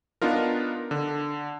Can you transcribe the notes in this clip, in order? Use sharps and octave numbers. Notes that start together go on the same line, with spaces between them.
B3 D4 D#4 F4 A#4
D3